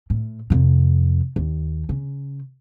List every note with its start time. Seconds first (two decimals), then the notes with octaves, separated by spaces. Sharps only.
0.10 A2
0.50 F2 C3
1.36 D#2
1.89 C#3